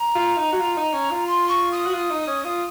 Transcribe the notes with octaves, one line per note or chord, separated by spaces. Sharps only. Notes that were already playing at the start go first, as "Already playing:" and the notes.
Already playing: A#5
F4
D#4
F#4
F4
D#4
C#4
F4
C6
C#6
D#6
F#4
F4
D#4
C#4
F4